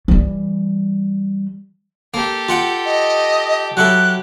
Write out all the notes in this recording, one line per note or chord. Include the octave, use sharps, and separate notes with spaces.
E3 G3
A#3 G4 A4
F4 F#5 G5
D#5
F#3 E4 G4 A4 F#6